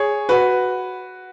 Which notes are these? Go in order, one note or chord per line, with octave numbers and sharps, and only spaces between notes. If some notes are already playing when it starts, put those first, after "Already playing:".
Already playing: G#4 C#5
F#4 B4